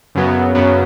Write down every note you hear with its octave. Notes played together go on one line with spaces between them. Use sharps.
F#2 C#3 F#3 B3
F#2 C#3 F#3 B3